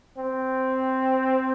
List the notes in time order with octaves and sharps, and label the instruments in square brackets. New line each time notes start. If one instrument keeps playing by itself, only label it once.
[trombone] C4